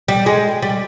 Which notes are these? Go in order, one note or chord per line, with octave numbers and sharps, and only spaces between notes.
G3
G#3
G3